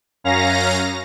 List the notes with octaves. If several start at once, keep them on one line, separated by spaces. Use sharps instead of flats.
F#2 C#4 F5 A#5 A#6